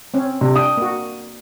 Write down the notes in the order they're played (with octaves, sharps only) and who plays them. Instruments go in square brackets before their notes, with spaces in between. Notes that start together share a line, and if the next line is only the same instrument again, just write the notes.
[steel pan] C4 C#4
[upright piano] C3 [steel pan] D4
[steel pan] D4 G5 [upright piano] D#6
[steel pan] A#3 F#4